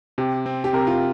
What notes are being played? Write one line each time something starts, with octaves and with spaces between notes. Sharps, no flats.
C3 G4
C4
G4
C3 A#4
F4